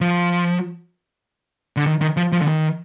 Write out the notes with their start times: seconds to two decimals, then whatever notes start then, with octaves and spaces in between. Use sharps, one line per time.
0.01 F3
1.77 D3
1.86 D#3
2.01 D#3
2.17 F3
2.32 F3
2.41 D3
2.47 D#3